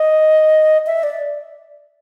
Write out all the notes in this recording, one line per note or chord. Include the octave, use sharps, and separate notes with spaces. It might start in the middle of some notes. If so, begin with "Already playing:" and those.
Already playing: D#5
E5
D5